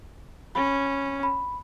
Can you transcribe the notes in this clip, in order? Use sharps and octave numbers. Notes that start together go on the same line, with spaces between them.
C#4 B5
B5